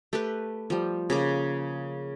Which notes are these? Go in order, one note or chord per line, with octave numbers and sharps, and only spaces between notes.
A3 G4 B4
F3 G3
C#3 A#3 D6